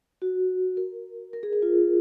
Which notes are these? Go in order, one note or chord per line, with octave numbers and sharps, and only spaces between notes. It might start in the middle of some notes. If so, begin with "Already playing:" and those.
F#4
A#4
A#4
G#4
A#4
F4